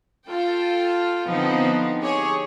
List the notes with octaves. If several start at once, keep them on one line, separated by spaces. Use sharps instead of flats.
F4 A4 G5
D3 F3 B3 C4 D#4
G4 G#4 C#5